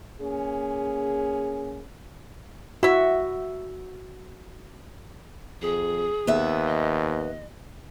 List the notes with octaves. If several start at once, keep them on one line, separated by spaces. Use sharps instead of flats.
A#3 C#4 G#4
E4 F#4 E5
F2 G#4
D#2 B3 E5
D#5